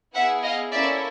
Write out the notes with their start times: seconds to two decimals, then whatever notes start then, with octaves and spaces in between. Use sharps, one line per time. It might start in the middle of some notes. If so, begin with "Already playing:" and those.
0.14 B3 E4 G#4 E5 F#5
0.43 D#5 F5
0.72 A#3 C#4 E4 A4 D5 E5